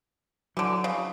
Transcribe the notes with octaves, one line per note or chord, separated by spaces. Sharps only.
D3 E3 F#3
C#3